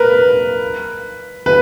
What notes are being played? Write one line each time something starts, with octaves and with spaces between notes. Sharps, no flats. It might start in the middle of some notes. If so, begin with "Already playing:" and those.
Already playing: A#4 B4
B4